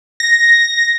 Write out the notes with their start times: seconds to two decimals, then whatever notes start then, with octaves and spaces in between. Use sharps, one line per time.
0.20 A#6